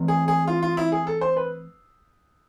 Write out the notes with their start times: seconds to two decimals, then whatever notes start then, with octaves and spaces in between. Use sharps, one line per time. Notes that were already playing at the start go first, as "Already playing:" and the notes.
Already playing: E3 A3 C4
0.08 G#4
0.28 G#4
0.47 F4
0.62 F4
0.77 E4
0.92 G#4
1.07 A4
1.21 C5
1.36 B4